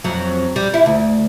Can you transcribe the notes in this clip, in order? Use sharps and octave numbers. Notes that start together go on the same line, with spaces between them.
F2 F#3
G3
E4
D2